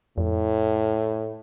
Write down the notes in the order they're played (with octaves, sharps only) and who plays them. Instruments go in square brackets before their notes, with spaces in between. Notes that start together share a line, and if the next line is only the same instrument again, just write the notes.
[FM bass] F2 [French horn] A2